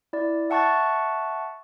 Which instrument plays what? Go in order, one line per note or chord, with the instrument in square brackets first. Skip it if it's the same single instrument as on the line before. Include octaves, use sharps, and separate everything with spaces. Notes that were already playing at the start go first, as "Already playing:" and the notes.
[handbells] E4 D5
E5 F#5 A5 C#6 F#6 A6